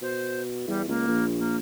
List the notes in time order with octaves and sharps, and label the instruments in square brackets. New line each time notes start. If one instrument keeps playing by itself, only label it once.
[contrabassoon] B2 [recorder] C5
[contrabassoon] E2 [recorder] G3
[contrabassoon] C#2 [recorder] A#3
[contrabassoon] A#1
[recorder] A#3